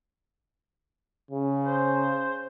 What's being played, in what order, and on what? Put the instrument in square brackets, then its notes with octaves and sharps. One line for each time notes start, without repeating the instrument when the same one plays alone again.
[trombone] C#3
[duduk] C5